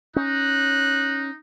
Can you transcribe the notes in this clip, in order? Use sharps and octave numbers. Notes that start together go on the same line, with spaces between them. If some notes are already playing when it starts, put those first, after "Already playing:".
C#4 D#4 F#6